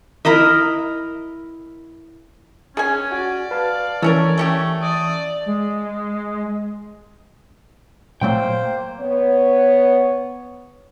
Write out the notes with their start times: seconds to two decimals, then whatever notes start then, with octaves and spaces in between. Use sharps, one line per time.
0.25 E4 A#4 D#5 E5
2.77 C#4 G#4 G#5
3.12 F#4 D5
3.51 B4 F5 A5
4.02 E3 A3 C#4 A#4 C#5
4.38 A3 C#4 G4
4.82 D5 D#6
5.46 G#3
8.21 A#2 F#3 A3 A#3 C5 G5
9.00 B3 C#5